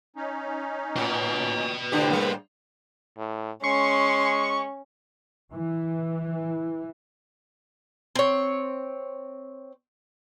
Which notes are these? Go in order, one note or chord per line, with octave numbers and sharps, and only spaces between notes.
C#4 D#4
A2 B4 D#5
A2 D3 D4 G4 C5
G3 A#3
A2
G#3 C#4 C6 C#6
E3
C4 C#5